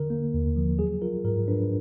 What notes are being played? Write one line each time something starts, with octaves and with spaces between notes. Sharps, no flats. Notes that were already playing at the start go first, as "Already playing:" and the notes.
Already playing: D3 A#4
A#3
D#2
F3
F#3 G#4
F4 A#4
G#2 A#4
D4 B4